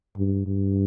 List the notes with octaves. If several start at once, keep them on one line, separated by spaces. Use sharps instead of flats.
G2
G2